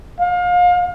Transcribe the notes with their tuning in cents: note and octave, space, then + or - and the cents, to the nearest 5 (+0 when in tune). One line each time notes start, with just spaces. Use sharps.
F5 +30